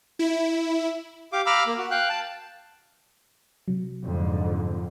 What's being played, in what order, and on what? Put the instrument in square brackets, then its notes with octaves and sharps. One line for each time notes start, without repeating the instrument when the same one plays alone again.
[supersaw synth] E4
[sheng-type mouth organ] G4 F5 D6
F5 A#5 B5 D6 E6 F6
A#3
F#4
F5 G5 F#6
A5
[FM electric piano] C3 F#3
[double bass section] F2 G#2 D3